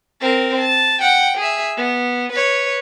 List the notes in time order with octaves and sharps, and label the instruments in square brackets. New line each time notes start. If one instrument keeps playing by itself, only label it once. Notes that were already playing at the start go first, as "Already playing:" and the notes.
[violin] C4 A#4
A5
F#5 G5
G#4 E5
B3
B4 C#5